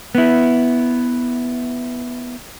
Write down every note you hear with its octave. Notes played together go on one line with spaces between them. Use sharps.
B3 E4